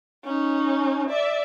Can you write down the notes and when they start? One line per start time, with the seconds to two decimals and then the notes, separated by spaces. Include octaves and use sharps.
0.24 C#4 D#4
1.10 D5 E5